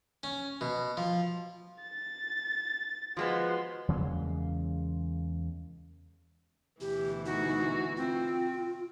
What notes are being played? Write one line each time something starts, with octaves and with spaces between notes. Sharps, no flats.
C#4
B2
F3
A6
F3 G#3 B3 F#4 C6
E2 C#3 G#3 A#3
D2 B2 E3 G4
D#4 F#4
C4 F4